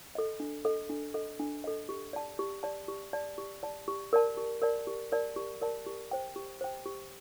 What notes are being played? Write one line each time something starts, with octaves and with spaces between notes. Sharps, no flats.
A4 D#5
D4
A4 D#5
D4
A4 D#5
D4
A4 D#5
G4
D5 A5
G4
D5 A5
G4
D5 A5
G4
D5 A5
G4
A#4 D5 A5
G4
A#4 D5 A5
G4
A#4 D5 A5
G4
A#4 D5 A5
G4
C5 G5
G4
C5 G5
G4